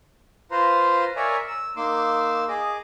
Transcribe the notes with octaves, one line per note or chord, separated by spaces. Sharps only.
F4 B4 C5 A#5 C6
A#4 C#5 D5 E5 G#5 A#5
E6
A#3 D#4 C6 D6 E6
G#4 D#5 D6